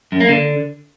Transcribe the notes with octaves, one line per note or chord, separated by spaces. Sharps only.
F#2
A#3
D3